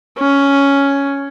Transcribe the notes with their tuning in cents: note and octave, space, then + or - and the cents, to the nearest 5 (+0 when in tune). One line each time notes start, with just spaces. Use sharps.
C#4 +5